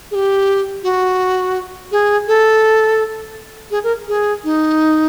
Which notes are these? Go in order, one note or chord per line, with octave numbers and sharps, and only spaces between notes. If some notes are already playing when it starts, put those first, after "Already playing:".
G#4
G4
F#4
G#4
A4
G#4
A#4
G#4
D#4